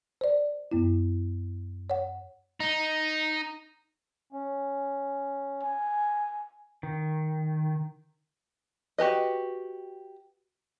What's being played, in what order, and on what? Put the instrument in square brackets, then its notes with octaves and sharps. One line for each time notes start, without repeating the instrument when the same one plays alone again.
[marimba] C5 D5
F#2 B3 E4
C#5 F#5
[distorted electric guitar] D#4
[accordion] C#4
[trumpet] G#5
[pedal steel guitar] D#3
[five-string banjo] F#4 G4 B4 D#5